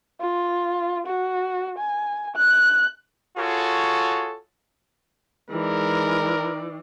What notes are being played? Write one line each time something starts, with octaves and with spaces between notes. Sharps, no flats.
F4
F#4
G#5
F#6
F4 F#4 G#4 A4 C#5
E3 G#3 D#4 A#4 D5